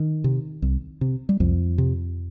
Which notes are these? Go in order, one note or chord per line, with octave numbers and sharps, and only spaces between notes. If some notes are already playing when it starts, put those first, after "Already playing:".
Already playing: D#3
C3
C2
C3
G3
C2 F2 F3
C3